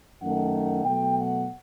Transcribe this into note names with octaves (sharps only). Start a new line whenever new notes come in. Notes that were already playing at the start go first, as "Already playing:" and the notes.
F#2 D#3 A3 F#5
F#5
B2 F#3 A3 G5
F#5